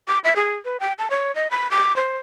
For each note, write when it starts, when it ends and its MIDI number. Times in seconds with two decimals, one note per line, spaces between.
0.08 0.19 86
0.24 0.34 76
0.36 0.55 68
0.65 0.77 71
0.80 0.93 79
0.99 1.08 81
1.10 1.34 73
1.35 1.50 75
1.51 1.69 83
1.71 1.96 86
1.96 2.17 72